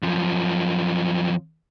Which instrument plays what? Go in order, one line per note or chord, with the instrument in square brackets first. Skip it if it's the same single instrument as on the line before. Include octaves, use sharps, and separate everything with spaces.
[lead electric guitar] F#2 F3